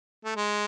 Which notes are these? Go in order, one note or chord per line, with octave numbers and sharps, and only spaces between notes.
A3
G#3